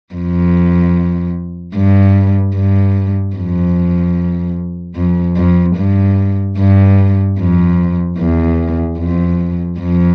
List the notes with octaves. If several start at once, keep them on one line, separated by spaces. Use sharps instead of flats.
F2
G2
G2
F2
F2
F2
G2
G2
F2
E2
F2
F2